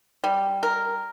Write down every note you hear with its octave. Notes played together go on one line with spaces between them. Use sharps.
G3
A#4